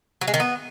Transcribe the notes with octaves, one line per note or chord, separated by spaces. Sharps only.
F#3
G#3
D#3
B3